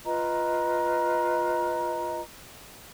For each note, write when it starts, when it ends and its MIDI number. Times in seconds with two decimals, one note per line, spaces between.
0.06 2.20 65
0.06 2.20 71
0.06 2.20 75
0.06 2.20 82